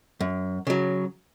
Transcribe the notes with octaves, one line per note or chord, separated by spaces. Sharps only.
F#2
C#3 F#3